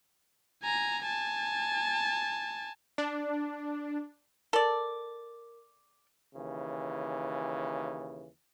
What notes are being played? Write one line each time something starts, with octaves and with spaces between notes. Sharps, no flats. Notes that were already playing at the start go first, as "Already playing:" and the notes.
G#5 A#5
G#5 A5
D4
A4 A#4 D5
D#2 C#3 E3